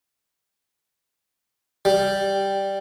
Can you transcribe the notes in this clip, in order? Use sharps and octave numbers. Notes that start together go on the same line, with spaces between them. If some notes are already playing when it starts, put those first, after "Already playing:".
G3